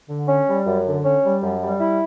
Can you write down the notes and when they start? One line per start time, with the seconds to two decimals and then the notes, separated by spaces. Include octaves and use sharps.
0.08 D3
0.27 C#4
0.47 G3
0.66 F#2
0.85 D3
1.04 C#4
1.23 G3
1.42 F#2
1.61 G3
1.80 E4